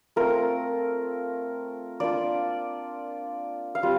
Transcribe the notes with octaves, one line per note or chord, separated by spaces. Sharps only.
A3 C4 F4 A#4
A#3 D4 F4 D5
F5
G3 C4 F4